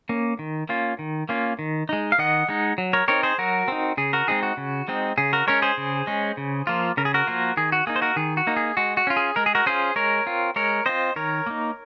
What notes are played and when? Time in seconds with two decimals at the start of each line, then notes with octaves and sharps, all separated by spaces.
0.09 A#3 C#4
0.39 D#3
0.69 A#3 C#4 F4
0.99 D#3
1.29 A#3 C#4 F4
1.59 D#3
1.89 G#3 D#4
2.12 F5
2.18 D#3 D#5 F#5
2.49 G#3 D#4
2.78 F#3
2.93 A#4 C#5
3.08 C4 D#4 A#4 C#5
3.23 G#4 C5
3.38 F#3 F#4 A#4
3.68 C4 D#4
3.97 C#3 G#4
4.13 F#4 A#4
4.28 G#3 C4 D#4 G#4
4.43 F#4
4.57 C#3
4.88 G#3 C4 D#4
5.18 C#3 G#4
5.33 F#4 A#4
5.47 G#3 C#4 A#4 C#5
5.62 G#4 C5
5.77 C#3
6.07 G#3 C#4
6.37 C#3
6.67 F3 A#3 F4
6.97 C#3 A#4
7.05 G#4
7.14 F#4 A#4
7.27 F3 A#3 F4
7.57 D#3 G#4
7.72 F#4
7.87 A#3 D#4 G#4
7.96 C5
8.02 F#4 A#4
8.16 D#3 G#4
8.37 F#4
8.47 A#3 D#4
8.57 G#4
8.77 G#3 F#4
8.97 F#4
9.07 C#4 F4
9.17 G#4
9.36 G#3 A#4
9.46 G#4
9.55 F#4 A#4
9.66 C#4 F4 G#4 C5
9.96 G#3 A#4 C#5
10.26 C4 F4
10.56 G#3 A#4 C#5
10.86 C4 F4 C5 D#5
11.16 D#3 A#4 C#5
11.46 A#3 D#4